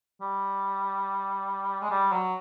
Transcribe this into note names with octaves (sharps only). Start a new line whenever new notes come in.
G3
G#3
G3
F#3